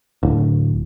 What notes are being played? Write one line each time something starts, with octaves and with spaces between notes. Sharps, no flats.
D1